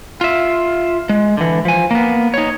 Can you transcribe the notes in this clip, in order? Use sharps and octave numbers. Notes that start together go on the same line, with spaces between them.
F4 E5
G#3
D3 E3
F3 G#5
A#3 B3
D#4 C#5